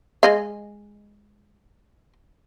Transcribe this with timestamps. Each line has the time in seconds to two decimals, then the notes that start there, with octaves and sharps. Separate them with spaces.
0.23 G#3 D#5 F5